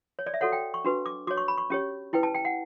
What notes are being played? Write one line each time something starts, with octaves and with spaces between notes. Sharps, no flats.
C#5
D5
E5
F#4 A4 C#5 F#5
G5
C#6
D4 F#4 B4
D6
F#4 C#5 D6
C#6
B5
C#6
C#4 G4 C#5
E4 B4 G5
A5
G5
F#5